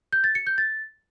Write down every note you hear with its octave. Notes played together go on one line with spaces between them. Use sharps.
G6
A6
C#7
G6
A6